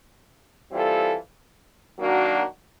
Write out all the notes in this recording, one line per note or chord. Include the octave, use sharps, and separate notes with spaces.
E3 G3 C4 F4 A4
D#3 F#3 A#3 D4 F#4